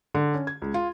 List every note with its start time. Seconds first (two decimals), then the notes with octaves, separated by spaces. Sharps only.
0.15 D3
0.34 C#4
0.47 G#6
0.62 C#2
0.74 F4